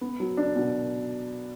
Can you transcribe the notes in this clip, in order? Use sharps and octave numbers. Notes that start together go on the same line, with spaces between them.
B3
F#3
D4
B2